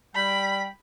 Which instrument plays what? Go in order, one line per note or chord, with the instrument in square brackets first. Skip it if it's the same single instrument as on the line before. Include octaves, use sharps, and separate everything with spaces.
[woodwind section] G3 G5 [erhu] B5